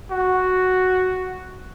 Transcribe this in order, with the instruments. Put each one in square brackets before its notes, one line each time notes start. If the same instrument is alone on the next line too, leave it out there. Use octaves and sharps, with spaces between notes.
[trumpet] F#4